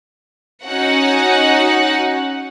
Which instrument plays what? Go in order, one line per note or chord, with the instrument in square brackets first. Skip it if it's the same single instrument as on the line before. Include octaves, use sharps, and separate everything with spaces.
[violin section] C#4 D#4 F#4 F#5